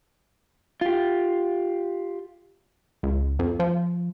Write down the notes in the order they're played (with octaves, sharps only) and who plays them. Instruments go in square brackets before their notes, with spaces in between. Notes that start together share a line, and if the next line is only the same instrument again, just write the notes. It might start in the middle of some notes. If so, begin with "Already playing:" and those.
[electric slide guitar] F4 G4
[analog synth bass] C#2
F2
F3